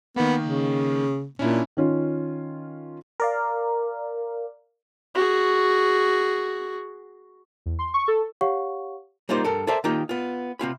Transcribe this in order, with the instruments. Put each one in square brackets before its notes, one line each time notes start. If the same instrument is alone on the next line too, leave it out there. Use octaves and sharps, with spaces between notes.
[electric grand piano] D#3 A#3 [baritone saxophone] B3
[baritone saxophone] C#3
[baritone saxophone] A#2 [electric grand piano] C#4 D4 E4
[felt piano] D#3 C#4 F4
[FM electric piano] A#4 D5 F5
[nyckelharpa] F#4 G#4
[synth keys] E2
C6
C#6
A4
[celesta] G4 C#5 F5 F#5 C#6
[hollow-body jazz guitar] G3 A#3 D#4 F4 C5
G2 A4 A#4
A4 A#4 C5 D5 E5 A5
D#3 A#3 D#4 F4 G4
B3 F4
C3 C4 F4 B5